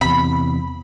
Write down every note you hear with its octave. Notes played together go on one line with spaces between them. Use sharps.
E2 C3 B5